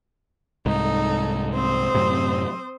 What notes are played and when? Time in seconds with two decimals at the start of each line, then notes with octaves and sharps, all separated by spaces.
0.66 C2 G#2 D#4 A4
1.53 C4 C5 D#6
1.95 F#2 A2 C3